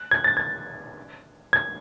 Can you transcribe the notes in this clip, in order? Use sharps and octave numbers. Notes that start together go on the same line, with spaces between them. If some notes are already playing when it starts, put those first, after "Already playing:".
Already playing: F#6
G#6
A6
G#6
G#6